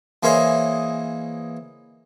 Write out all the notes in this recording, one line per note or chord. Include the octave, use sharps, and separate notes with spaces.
E3 A#3 G#4 C5 C#5 D#5